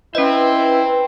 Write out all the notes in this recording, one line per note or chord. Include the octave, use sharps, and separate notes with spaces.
C#4 E4 B4 C5 D#5 G5